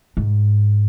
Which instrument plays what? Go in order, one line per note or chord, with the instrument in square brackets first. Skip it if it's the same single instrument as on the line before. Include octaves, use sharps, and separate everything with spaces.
[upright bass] G#2